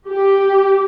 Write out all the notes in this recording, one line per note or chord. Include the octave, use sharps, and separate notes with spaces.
G4